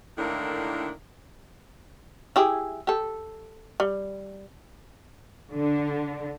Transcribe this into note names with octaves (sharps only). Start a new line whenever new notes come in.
A2 D3 D#3 A#3 D4 E4
E4 G4 G#4
G4 A4
G3
D3